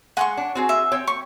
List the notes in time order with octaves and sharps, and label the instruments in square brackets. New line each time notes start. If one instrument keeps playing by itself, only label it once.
[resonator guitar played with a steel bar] G#3 [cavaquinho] F#5 C6 C#6
[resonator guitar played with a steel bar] D4
C4 F#4 G#4
[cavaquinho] E5
[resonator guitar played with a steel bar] C4 C#5 G5
[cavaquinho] C#6